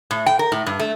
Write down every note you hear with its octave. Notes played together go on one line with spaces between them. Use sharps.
A2
G5
A#4
A2
G2
A3